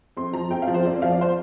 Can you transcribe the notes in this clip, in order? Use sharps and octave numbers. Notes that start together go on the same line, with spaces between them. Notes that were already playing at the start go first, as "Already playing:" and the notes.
F2 C6
F3 A#5
F2 G5
F5
F3
C5
F2 D5
F3 F5
D5
C5